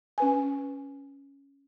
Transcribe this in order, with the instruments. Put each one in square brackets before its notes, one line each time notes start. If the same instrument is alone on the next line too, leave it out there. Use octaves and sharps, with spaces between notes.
[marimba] C#4 B4 G#5